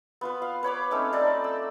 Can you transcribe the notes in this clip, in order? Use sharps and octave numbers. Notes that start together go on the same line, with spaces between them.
B3 F4 B4
F5
B4 C#5 B5 D6
A3 C4 C#4 D#4
D#4 A4 D5
E6